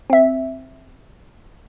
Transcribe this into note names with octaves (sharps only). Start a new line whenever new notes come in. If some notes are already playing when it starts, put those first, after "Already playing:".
C4 E5